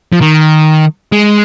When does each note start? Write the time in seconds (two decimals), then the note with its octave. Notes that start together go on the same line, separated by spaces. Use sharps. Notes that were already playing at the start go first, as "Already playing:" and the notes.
0.13 F3
0.21 D#3
1.12 G#3